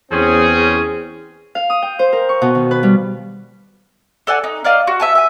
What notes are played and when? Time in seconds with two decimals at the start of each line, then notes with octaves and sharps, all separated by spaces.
0.11 E2 C4 C#4 G#4
1.55 F5
1.70 D#6
1.82 G5
1.99 C5
2.12 A#4
2.29 C#6
2.42 B2
2.55 D#3
2.71 B4
2.83 G3
4.27 A4 D5 F#5 G#5
4.44 D#4
4.64 A#4 D5 D#5 F5
4.87 F#4
5.00 E5 G#5 A5
5.15 E5 G#5